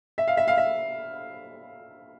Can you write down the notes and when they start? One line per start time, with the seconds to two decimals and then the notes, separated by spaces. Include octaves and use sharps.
0.18 E5
0.28 F5
0.37 E5
0.48 F5
0.57 E5